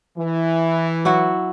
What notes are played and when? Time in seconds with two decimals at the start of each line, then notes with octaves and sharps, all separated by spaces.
0.18 E3
1.05 F#3 E4 F#4